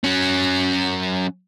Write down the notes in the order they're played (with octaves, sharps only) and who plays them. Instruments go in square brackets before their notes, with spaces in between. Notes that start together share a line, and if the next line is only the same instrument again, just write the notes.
[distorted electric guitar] F#3 C#4